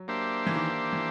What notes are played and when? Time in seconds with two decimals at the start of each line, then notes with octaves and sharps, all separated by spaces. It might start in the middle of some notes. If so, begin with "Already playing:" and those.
Already playing: F#3
0.08 A#3 D4 G4 C5 E5
0.46 E3
0.56 D#3
0.92 E3